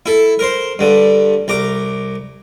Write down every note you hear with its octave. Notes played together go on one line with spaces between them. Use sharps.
E4 A4
A#4 C5
G2 D3
C2 A#5 D6